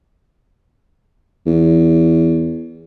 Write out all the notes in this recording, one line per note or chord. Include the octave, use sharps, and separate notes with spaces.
E2